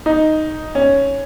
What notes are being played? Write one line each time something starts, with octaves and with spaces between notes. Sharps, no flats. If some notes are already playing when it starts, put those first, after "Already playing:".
D#4
C#4